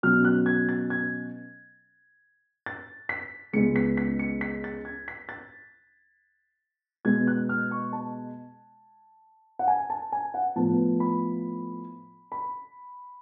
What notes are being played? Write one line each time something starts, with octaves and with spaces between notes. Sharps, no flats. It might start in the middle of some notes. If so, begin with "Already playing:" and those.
B2 F#3 C#4 F6
F#6
G#6
A6
G#6
A6
B6
C#2 C#3 G#3 B3 C#7
B6
B6
C#7
B6
A6
G#6
B6
A6
B2 G#3 B3 G#6
F#6
F6
C#6
A5
F#5
G#5
A5
G#5
F#5
A2 F3 B3 A5
B5
B5